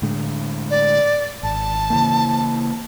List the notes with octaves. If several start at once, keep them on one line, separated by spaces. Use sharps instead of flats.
A2 D3 G#3
D5
G#1 A5
C#3 E3 A#3